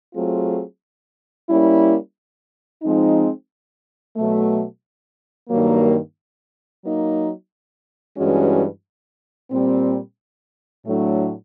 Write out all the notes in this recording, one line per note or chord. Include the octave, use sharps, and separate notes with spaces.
F#3 A3 C4 F4 G#4
G3 A#3 C#4 E4
F3 G#3 C4 D#4
B2 F#3 A3
G2 D#3 F#3 A#3
F#3 A#3 D#4
G2 E3 G#3 C#4 F#4
A#2 G3 C4
A2 F#3 A3 D4